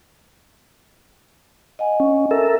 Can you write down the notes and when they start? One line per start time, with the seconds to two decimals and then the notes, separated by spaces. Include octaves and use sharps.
1.79 D#5 F#5 G#5
2.00 C#4
2.31 A4 A#4 E5